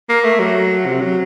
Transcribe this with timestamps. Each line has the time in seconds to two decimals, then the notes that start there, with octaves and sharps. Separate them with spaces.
0.09 A#3
0.24 A3
0.39 F#3
0.86 C3
1.01 F#3